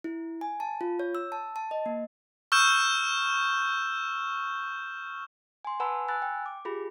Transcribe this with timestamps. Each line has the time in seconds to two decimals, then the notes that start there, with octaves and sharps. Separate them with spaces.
0.04 E4
0.41 G#5
0.60 A5
0.81 F4
0.99 C#5
1.15 E6
1.32 A5
1.56 A5
1.71 D#5
1.86 A#3
2.52 C#6 E6 F6 G6 E7
5.65 G#5 C6
5.80 B4 F#5 G#5 A5 B5 E6
6.08 G#5 B5 E6 F#6 A6
6.22 G5
6.46 D6
6.65 F4 G4 G#4 B5